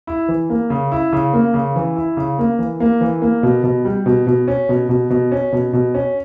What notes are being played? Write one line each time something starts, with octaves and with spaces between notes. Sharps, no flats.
E4
E3
A#3
C#3
E4
C#3
A#3
C#3
E3
E4
C#3
A#3
E3
A#3
E3
A#3
B2
B2
G3
B2
B2
C#4
B2
B2
B2
C#4
B2
B2
C#4